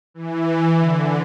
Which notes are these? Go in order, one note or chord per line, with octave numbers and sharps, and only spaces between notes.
E3
D3